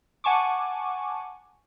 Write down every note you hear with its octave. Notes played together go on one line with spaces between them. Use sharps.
F#5 G#5 A5 C#6 D6